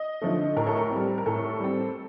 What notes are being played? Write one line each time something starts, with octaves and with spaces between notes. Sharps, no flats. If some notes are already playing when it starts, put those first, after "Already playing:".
Already playing: D#5
D3 F3 A3
A2 A#4
A4
A#4
G3 C4
A#4
A2 A4
G3 C4